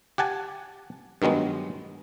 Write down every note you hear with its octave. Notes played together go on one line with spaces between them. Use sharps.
G4 F#5 G#5 A5
G2 D#3 F#3 G#3 B3